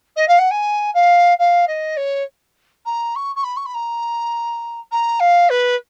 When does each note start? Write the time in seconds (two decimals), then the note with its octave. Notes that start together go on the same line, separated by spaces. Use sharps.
0.16 D#5
0.27 F5
0.38 F#5
0.50 G#5
0.94 F5
1.38 F5
1.67 D#5
1.96 C#5
2.85 A#5
3.15 C#6
3.35 C#6
3.43 B5
3.56 C#6
3.65 B5
3.74 A#5
4.91 A#5
5.19 F5
5.49 B4